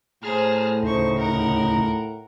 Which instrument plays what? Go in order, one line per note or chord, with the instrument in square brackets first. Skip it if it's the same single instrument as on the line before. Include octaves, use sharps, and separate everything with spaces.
[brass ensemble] A2 [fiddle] G#4 C5 [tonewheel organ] A5 A#5 F6
[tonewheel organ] D2 C#3 D#4 [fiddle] C5 C#6
[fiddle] A#4 F#5